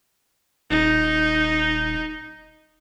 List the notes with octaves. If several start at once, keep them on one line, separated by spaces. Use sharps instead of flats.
D#1 D#4